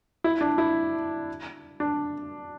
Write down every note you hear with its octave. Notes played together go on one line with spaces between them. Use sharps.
E4
D4
E4
D4